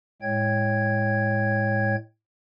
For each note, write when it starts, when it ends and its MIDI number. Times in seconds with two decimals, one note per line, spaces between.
0.22 1.96 45
0.22 1.96 56
0.22 1.96 73
0.22 1.96 79
0.22 1.96 92